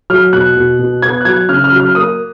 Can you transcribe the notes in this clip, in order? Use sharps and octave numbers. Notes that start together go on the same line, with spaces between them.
F#3 F6
B2 F#6
B2
B2
B3 G#6
F#6
F#3 G#6
C#3 F6
F6
F#3
F6
A#3 D#6